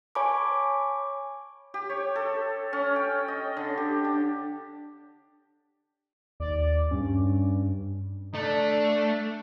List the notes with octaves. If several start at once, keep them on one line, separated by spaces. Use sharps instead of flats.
C#5 G#5 A5 B5 C#6 D6
G4
C#5
A4
C#4
G5
D#5
D3
G4
D4
D#2 D5
G2 C#4
A3 D4